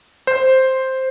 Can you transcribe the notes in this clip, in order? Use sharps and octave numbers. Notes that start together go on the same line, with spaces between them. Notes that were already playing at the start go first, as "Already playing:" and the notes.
C5